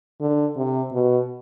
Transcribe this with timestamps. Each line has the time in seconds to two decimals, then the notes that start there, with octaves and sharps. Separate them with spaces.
0.21 D3
0.56 C3
0.93 B2